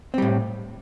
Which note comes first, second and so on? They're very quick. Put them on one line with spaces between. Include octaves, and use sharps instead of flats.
C4 G3 A2